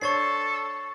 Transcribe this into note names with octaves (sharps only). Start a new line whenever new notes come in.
D4 A4 C5 C#5 C#6 A6 C7